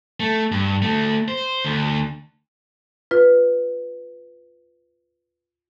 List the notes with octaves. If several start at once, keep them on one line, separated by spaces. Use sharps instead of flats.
A3
G2
D2 A3
C5
D2
F4 B4